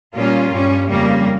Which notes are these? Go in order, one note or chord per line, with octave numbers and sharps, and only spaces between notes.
A#2 G3 A#3 C#4 F4
G2 G3 C#4
F2 C#3 G3 A#3